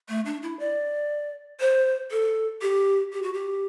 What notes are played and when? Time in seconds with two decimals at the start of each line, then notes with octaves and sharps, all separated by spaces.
0.09 A3
0.26 D4
0.43 E4
0.60 D5
1.60 C5
2.11 A4
2.62 G4
3.13 G4
3.23 F#4
3.33 G4